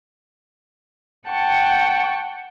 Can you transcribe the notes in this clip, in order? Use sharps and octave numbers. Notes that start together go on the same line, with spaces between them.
F#5 G5 A5 C#6